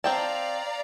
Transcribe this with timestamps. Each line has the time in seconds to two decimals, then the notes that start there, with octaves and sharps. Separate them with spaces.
0.04 C4 D5 F5 G5 A5 A#5